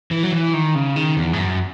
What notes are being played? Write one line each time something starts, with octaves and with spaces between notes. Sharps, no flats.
E3
F#3
E3
D#3
C#3
D#3
E2
G#2
F#2